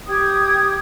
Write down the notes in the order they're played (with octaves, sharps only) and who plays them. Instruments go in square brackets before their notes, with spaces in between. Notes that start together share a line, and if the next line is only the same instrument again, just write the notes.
[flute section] G4 G5 D#6 G#6